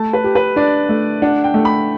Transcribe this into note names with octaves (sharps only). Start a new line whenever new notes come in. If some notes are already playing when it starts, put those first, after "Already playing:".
Already playing: A3 A5
B4
G4
B4
D4 D5
A3
D4 F#5
G5
A3
B5